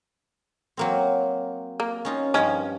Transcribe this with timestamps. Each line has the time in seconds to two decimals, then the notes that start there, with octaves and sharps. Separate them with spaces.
0.77 F#3 A#3 C4
1.80 A#3
2.05 C#4 D#4 F4
2.34 G2 D#3 F3 C#4